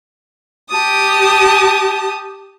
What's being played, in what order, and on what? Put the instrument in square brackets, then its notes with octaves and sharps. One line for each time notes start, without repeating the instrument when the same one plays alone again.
[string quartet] G4 A5 D#6